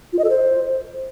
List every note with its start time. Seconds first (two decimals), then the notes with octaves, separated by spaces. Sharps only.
0.13 F4
0.19 D#5
0.24 A4
0.30 C5